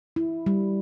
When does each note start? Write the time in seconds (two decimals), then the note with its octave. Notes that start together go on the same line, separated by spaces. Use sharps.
0.16 E4
0.46 G3